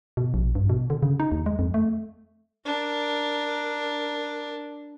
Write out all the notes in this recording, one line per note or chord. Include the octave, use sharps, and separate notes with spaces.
B2
A#1
G2
B2
D3
C#3
D#4
D#2
G#3
F2
A3
D4 A#4